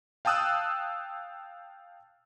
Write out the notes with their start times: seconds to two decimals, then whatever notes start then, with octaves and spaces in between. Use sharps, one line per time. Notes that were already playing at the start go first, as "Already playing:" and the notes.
0.25 F5 G5 A5 D#6 E6 F#6